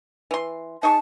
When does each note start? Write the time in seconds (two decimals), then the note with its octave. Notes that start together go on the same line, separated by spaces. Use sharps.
0.31 E3 C6
0.83 D#4 G#4 A5 C#6